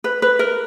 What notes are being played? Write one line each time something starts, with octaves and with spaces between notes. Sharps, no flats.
B4
B4
A#4